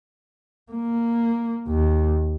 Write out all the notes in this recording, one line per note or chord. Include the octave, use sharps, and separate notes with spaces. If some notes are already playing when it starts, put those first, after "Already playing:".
A#3
D#2